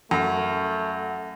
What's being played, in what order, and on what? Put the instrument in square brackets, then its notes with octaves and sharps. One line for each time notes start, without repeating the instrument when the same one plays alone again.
[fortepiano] F#2 [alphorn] A3